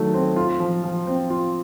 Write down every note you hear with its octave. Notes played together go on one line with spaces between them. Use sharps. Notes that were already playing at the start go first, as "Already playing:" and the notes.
Already playing: D#3 F#3 A3
C4
F4
F3
F3
C4
F4